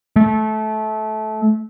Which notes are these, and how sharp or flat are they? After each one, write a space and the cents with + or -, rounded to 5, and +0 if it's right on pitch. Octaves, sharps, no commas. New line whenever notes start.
A3 -20